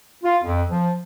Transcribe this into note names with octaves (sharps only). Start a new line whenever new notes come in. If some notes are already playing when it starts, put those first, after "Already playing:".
F4
F2
F3